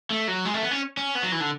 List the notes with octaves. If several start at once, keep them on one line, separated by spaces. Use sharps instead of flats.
A3
F#3
G#3
A3
B3
C#4
C#4
B3
F#3
E3
D3